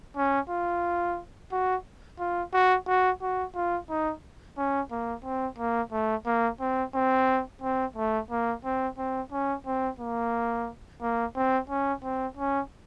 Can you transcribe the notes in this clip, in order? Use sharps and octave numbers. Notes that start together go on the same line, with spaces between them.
C#4
F4
F#4
F4
F#4
F#4
F#4
F4
D#4
C#4
A#3
C4
A#3
A3
A#3
C4
C4
C4
A3
A#3
C4
C4
C#4
C4
A#3
A#3
C4
C#4
C4
C#4